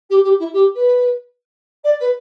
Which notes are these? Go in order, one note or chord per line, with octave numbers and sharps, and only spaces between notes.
G4
G4
E4
G4
B4
D5
B4